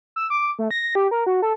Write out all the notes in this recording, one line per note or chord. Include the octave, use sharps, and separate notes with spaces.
E6
D6
A3
A#6
G4
A#4
F#4
A4